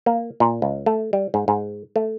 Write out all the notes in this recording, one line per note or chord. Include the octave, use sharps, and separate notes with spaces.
A#3
A#2
C#2
A3
G3
G#2
G#2
A3